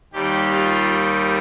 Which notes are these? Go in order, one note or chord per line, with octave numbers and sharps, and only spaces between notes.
D#2 D#3 G3 G4
F4